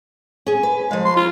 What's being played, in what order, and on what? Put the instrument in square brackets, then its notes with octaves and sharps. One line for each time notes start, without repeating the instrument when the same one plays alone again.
[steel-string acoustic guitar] C#4 G#4
B4
[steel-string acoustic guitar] F3 F5 [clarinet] G#3
[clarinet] C6
F4